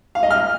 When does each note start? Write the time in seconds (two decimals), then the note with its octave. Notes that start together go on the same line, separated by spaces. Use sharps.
0.15 F5
0.23 D#5
0.31 F6